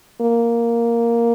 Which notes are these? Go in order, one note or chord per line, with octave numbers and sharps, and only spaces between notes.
A#3